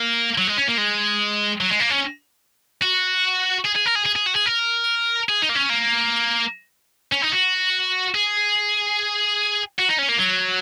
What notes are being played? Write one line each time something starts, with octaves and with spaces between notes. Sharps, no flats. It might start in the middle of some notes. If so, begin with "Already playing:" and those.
Already playing: A#3
F#3
G#3
C#4
A#3
G#3
F#3
G#3
A#3
C#4
F#4
G#4
G#4
A#4
G#4
G#4
G#4
F#4
G#4
A#4
G#4
D#4
A#3
C#4
A#3
C#4
D#4
F#4
G#4
F#4
D#4
C#4
A#3
F#3